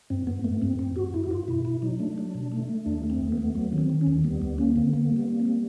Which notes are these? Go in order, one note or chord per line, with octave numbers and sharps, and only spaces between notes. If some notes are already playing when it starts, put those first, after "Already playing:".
G2 C4
G2 B3
A3 B3
G2 C4
G2 C4
G2 F#4
G2 E4
F#4
G2 F4
B2 E4
B2 E4
F#3 D#4
A3 D4
F#3
B2
A3
A3
D#2 D4
A3
C4
D#2
B3
A3
F#3 B3
D#3
C4
D#3
C#4
D#2
G3 B3
D2 B3
A#3 C#4
D3 C4
A#3 B3
G3
B3
A#3
C4
G3